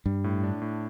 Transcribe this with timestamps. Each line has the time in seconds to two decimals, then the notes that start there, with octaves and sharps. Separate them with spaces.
0.05 G2 G3
0.24 A2
0.44 D4
0.62 A2